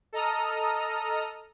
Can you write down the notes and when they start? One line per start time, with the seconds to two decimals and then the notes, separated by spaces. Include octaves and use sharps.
0.13 A4 D#5 A#5 D#6 F6